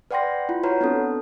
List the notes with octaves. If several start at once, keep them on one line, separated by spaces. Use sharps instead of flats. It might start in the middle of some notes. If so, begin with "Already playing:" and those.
B4 D5 F#5 G5 C6 A#6
E4 F4
F#4 B4 C#5 F#5 A#5
B3 C4 D4 A4